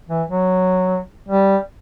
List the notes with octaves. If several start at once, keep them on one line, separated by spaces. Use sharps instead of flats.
E3
F#3
G3